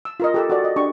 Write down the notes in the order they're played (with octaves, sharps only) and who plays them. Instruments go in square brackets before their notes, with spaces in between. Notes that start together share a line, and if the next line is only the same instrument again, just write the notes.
[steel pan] E6
F4 A#4 D#5
G4 A4 E6
F#4 A4 D5
D#5
D4 G4 C#6